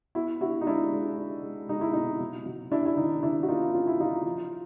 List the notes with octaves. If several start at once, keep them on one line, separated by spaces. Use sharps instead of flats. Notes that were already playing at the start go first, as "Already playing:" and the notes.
B3 E4 F#4
D4 E4 F#4
D#4
G#3 D4 E4
G#3
D4
G#3
G#3 D#4
E4
B2 D#4
F#3
F#3
C#4 D4 E4
E4
D#3 D#4
D#3 D4 E4
F#4
A#3 D#4 F4
C#4 F4
E4
F#3 D#4 F4
F3